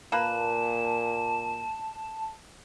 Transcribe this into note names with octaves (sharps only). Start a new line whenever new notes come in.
A#2 A#3 B4 A5 E7